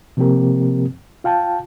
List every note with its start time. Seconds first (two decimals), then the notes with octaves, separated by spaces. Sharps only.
0.17 C3 F3 A#3 C4 G4 A#4
1.24 F4 F5 G5 A5